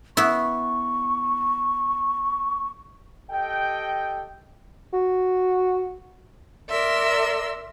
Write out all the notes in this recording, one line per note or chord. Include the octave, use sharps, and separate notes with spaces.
B3 E4 C#6
G4 A4 D#5 G5
F#4
A#4 D5 E5 C6 E6